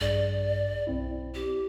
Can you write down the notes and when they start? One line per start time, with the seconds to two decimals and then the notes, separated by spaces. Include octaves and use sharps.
0.01 A#1 G2 G#4 D5
0.87 B1 C4 E4
1.34 G4